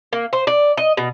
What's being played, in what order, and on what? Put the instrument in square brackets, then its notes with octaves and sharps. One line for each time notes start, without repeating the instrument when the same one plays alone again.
[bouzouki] A#3
C5
D5
D#5
B2